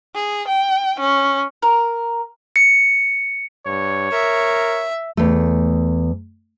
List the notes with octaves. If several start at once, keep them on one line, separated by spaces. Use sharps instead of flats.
G#4
G5
C#4
A#4
C#7
G2 C#5
A#4 E5
E2 A3